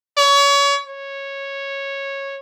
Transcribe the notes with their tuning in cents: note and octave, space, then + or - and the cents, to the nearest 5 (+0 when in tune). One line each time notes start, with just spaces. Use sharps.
C#5 +30
C#5 -10